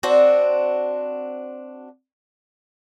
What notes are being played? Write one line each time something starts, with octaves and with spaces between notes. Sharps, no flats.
C4 D4 F#4